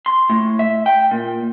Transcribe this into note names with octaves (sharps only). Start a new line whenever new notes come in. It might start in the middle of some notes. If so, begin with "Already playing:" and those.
C6
A2
E5
G5
A#2